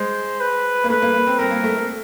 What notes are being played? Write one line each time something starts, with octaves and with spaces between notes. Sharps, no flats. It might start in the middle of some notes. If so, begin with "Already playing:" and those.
Already playing: G#3 C5
B4
A#3
A3 B4
A#3
A#3
C4
C4 A#4
A#3
A3
A3